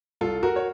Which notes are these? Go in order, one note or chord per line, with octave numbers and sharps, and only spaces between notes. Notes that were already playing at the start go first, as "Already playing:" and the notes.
C2 F4 A4
F#4 A#4
C#5